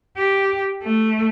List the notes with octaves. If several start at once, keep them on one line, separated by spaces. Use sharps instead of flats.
G4
A3